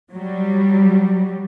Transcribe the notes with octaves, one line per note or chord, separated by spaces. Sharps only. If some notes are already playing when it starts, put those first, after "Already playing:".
F#3 G3